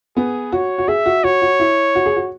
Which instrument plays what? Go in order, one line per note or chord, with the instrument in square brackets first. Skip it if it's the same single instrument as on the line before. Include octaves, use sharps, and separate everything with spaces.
[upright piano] B3 [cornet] G#4
[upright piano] F#4 [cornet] C#5
[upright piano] F#4
[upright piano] G#4 [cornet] E5
[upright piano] F#4
[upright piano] F#4 [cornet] C#5
[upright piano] F#4
E4
F#4
G#4
F#4